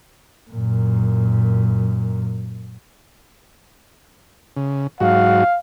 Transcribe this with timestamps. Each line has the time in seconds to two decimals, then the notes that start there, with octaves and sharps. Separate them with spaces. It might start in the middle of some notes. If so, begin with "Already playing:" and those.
0.51 F#2 A#2
4.56 C#3
5.00 G#2 F#3 F#4 F5